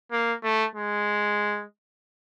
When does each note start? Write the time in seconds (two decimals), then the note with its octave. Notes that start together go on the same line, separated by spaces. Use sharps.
0.12 A#3
0.43 A3
0.76 G#3